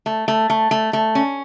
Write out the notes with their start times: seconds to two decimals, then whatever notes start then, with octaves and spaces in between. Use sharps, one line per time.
0.06 A3
0.28 A3
0.50 A3
0.71 A3
0.93 A3
1.15 C#4